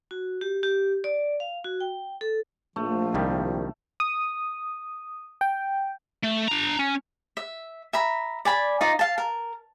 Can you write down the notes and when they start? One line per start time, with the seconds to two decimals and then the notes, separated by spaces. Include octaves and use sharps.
0.11 F#4
0.41 G4
0.63 G4
1.04 D5
1.40 F5
1.64 F#4
1.80 G5
2.21 A4
2.76 A#1 F3 A3
3.14 C2 D#3 G3
4.00 D#6
5.41 G5
6.24 A3
6.48 D4 A#5
6.79 C#4
7.37 E5
7.93 E5 A#5 B5
8.45 D5 G#5 B5
8.81 D#4 F4 D5 D#5
8.99 F5 A5
9.18 A#4